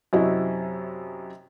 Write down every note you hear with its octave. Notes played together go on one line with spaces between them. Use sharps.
F#2 C3 E4 F#4 D#5